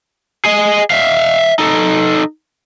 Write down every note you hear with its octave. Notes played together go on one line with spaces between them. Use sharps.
G#4 D#5
E5 F5
D#4 A4